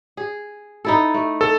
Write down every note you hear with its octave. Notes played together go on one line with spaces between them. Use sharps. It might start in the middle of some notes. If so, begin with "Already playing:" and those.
G#4
D#4 E4 A4
A3
A4